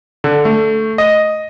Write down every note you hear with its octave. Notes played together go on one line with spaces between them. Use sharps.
D3
A3
D#5